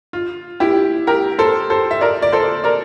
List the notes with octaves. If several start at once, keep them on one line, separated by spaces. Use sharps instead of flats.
F4
E4 G4
G4 A#4
A4 C5
A4 C5
E5
A#4 D5
D5
A4 C5
A#4 D5